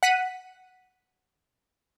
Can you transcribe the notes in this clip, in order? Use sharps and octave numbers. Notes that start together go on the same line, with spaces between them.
F#5 B6 D#7